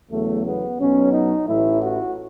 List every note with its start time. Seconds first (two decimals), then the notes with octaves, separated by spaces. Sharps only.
0.11 E2 C#3 F#3 A3
0.45 B3
0.79 B1 B2 F#3 C#4
1.13 D#4
1.47 A1 A2 E3 E4
1.81 F#4